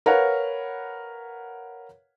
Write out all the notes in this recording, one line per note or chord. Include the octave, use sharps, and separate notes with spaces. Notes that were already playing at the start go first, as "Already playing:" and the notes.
A#4 B4 C#5 F5 F#5